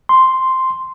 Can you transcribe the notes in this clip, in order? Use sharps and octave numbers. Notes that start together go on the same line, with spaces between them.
C6